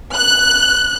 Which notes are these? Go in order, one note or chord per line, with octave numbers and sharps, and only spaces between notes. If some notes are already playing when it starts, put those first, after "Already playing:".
F#6